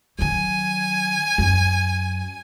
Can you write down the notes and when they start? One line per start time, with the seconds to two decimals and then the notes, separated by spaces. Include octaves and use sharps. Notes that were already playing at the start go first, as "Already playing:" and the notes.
0.19 D#3 F#3 G#5
1.38 F#2